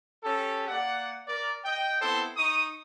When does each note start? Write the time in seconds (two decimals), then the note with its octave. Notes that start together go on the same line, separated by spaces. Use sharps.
0.24 C#4 G4 A4
0.68 A#3 D5 F#5
1.27 A#4 D5
1.65 D#5 G5
2.01 B3 C4 E4 A4 C5
2.37 D#4 C#6 D#6